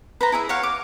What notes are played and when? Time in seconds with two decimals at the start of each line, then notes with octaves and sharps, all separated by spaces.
0.21 B4 C5 A#5
0.32 E4 G#4 E5
0.49 C#5 F5 F#5
0.63 D6